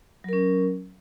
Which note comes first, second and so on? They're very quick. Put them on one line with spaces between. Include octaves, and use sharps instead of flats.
F#3 A#4 C#4